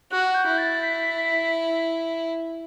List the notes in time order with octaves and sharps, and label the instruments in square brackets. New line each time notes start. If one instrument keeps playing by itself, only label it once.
[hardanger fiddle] F#4 [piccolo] F#6
[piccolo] G6
[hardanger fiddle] E4
[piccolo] A6
B6
B6